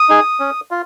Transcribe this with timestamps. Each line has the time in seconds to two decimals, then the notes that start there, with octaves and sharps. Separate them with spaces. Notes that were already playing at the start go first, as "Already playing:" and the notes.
Already playing: D#6
0.09 D#4 G#4
0.40 C#4
0.71 F4